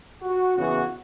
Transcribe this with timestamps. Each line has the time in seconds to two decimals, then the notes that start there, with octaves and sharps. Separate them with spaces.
0.23 F#4
0.56 C#3 E3 B3 F#4